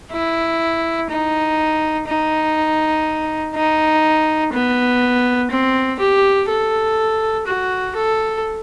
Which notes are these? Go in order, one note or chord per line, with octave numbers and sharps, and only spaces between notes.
E4
D#4
D#4
D#4
B3
C4
G4
A4
F#4
A4